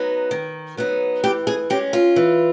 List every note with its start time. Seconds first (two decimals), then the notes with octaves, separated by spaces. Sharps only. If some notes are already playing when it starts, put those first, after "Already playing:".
Already playing: F#3 B3 D#4
0.31 D#3
0.77 F#3 B3 D#4
1.24 E3 G4
1.47 G#4
1.70 G#3 C#4 G4
1.93 F4
2.16 E3